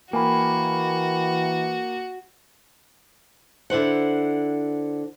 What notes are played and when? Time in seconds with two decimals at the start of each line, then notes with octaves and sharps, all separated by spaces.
0.13 E3 A#3 F#4 G5 G#5 B5
3.70 D3 E4 C5 F#5